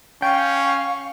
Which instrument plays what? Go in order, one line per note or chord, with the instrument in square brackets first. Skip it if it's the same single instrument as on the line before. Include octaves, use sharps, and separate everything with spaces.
[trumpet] C#4 [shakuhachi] F5 [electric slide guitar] G5 [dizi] C#6